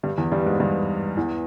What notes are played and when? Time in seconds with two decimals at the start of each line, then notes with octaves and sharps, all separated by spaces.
0.03 G2 G3
0.18 E2 E3
0.32 G2 G3
0.46 G#2 G#3
0.60 G2 G3
1.16 E2 E3